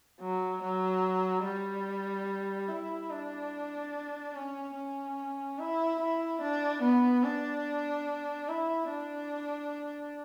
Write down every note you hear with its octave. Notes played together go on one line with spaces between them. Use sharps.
F#3
F#3
G3
E4
D4
C#4
C#4
E4
E4
D4
B3
D4
E4
D4